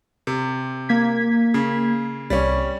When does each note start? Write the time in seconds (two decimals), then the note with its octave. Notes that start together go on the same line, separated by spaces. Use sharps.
0.27 C3
0.89 A#3 G#6 B6
1.54 C#3
2.30 C2 G3 C#4